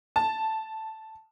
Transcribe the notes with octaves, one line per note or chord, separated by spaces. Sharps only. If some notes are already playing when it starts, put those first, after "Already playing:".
A5